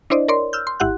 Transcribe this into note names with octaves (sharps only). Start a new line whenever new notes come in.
D4 E4 C5 D5 D#5
A#4 C#5 D5 C6
E6 F6 G6
C6
G#1 E4 G4 F#5 F#6